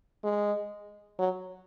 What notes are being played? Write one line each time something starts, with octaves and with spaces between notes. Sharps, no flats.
G#3
F#3